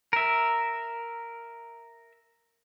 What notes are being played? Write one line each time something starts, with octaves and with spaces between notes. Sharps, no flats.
A#4 E5